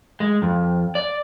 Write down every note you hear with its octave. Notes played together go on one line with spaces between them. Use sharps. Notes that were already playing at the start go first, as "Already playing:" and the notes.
G#3
F2
D5